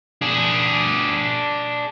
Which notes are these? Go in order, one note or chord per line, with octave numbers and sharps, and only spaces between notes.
D4 G#4